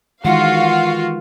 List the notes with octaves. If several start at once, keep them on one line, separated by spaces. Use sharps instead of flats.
D#3 E3 G#3 F4 F#4 F5 F#5